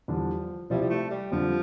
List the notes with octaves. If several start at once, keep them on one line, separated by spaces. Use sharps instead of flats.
E2 D3 F3 G3 D4
C3 F3 G3 C4 E4 G4
G3
A3
G3
F2 D3 F3 G3 D4